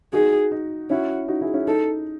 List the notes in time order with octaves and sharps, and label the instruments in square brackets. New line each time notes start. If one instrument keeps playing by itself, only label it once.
[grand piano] D#4 F#4 [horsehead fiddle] G#4
[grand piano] D#4
[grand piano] C#4 E4 [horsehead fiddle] F#4
[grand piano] D#4 F#4
E4 G#4
C#4 E4
[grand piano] D#4 [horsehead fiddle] A4